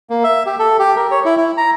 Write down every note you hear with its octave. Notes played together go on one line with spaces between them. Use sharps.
A#3
E5
G4
A4
G4
A#4
C#5
E4
E4
A#5